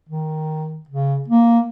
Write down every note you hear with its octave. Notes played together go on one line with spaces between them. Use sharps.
D#3
C#3
A#3